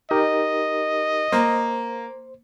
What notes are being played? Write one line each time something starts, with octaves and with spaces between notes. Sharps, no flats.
D#4 G4 A#4 D#5
A#3 C5